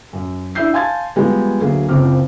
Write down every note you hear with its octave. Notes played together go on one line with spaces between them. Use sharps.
F#2
D4 E4 E5 E6 G6 C7
F5 G#5 A5 C6 G#6 A6
F3 G3 G#3 B3
D2 F#3 A#3 G#4
F#1 C#2 C4 F4 D6 F6